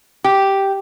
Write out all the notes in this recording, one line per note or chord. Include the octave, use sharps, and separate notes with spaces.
G4